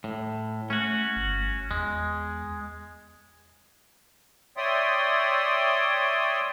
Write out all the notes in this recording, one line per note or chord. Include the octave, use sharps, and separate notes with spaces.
A2
A3 C#4 F#4
G1
E2 G#3
C#5 D5 E5 G5 C6 D#6